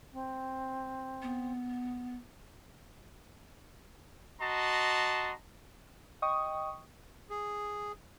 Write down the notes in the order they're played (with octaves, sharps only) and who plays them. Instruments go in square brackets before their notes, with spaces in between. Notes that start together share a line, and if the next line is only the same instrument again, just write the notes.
[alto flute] C4
[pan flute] B3
[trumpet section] F#4 D#5 A5 A#5 C6
[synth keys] D#5 G5 C#6 D#6
[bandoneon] G#4